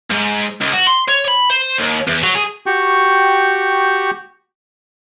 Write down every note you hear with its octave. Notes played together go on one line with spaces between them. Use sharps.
G#2
C#2
F#4
C6
C#5
B5
C5
D#2
E2
F#3
G#4
F#4 G4 G5 C#6